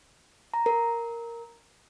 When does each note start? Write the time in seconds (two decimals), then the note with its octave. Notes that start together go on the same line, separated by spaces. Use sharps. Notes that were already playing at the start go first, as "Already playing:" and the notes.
0.54 A#5
0.66 A#4